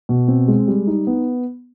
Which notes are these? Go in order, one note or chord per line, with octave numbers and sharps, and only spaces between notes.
B2
C4
G#3
G3
D#4
B3